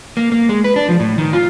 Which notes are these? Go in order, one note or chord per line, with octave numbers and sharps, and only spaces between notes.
A#3
A#3
G#3
B4
D4
F3
A2
D#3
F4